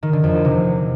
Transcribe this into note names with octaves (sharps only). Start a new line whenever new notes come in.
D#3
D3
F2
E2
C3